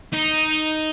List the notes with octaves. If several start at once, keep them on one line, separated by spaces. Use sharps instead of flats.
D#4